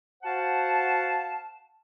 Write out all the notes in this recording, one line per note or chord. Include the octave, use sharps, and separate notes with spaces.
F#4 C5 F5 F#5 A5